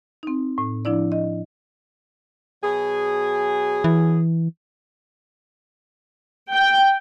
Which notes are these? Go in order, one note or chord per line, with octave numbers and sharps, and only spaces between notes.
C4 D#4
A2
F3 D4 E4 D5
D#5
B2 F#3 G#4
E3
G5